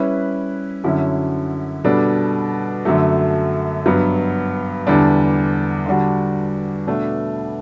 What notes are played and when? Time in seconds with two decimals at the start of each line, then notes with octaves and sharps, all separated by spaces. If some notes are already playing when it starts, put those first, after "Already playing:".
Already playing: G3 C#4 E4 B4
0.84 F#2 D3 F#3 C#4 E4
1.84 B2 G3 D4 A4
2.85 F#2 D3 F#3 A3
3.86 G2 F#3 B3
4.87 E2 D3 G3 D4
5.86 D3 G3 D4 F#4
6.87 B2 A3 D4